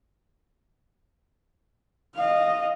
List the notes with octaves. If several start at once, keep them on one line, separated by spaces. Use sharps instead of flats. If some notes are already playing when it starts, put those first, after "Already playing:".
D#5 F5